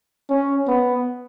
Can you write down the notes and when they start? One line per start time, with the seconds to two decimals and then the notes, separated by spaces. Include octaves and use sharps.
0.30 C#4
0.68 B3